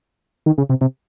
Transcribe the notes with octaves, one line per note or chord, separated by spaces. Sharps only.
D#3
C#3
C3
C3